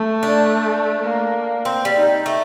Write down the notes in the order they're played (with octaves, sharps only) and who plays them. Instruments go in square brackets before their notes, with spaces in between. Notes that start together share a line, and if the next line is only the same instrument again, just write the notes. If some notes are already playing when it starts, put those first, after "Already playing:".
Already playing: [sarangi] A3
[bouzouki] D4
[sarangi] A#3
[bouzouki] C4
G3
[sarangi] D#4
[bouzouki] A3